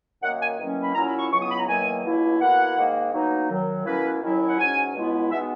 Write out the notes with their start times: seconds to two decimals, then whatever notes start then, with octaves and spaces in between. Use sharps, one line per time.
0.22 F#2 D#3 A#3 F#5
0.40 G#5
0.58 E2 D#3 F#3 A#3 C#4
0.83 B5
0.94 A#2 F#3 C#4 E4 A#5
1.07 B5
1.18 C#6
1.31 C#2 C#3 F#3 B3 E4 C#6
1.40 D#6
1.50 B5
1.58 A#5
1.67 E2 D#3 F#3 A#3 G#5
2.04 C#2 B2 A#3 E4
2.40 B2 A#3 E4 F#5
2.77 G#2 D#3 A#3
3.13 B2 F#3 A#3 D#4
3.49 F#2 D#3 F#3
3.85 B2 A#3 C#4 E4 B4
4.21 D#2 D#3 F#3 C#4 E4
4.48 F#5
4.58 G#2 F#3 C#4 G#5
4.94 C#2 B2 G#3 B3 E4
5.31 B2 G#3 B3 D#4 E5